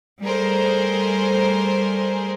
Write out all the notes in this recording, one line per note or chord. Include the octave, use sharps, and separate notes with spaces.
G3 A3 G#4 A#4 C5